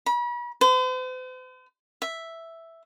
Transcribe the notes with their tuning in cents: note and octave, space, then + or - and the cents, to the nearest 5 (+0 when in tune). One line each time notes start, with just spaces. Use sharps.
B5 -40
C5 -45
E5 +0